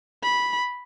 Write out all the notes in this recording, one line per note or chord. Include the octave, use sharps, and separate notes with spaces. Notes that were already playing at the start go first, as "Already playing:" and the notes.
B5